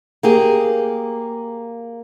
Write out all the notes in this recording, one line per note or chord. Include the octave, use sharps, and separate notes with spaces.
A#3 G4 G#4